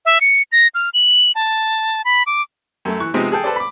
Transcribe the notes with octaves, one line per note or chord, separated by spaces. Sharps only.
E5
C#7
A#6
F6
F#7
A5
B5
D6
F#2 A3
E3 C#6 F#6
C3 F3 G#3 B3 C4 D#4
G#4 A4 G5
A4 B4 C5 D5
B5 D6